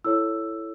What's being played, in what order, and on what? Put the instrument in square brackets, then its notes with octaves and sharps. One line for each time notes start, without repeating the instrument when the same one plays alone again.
[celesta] E4 A4 C#5 E6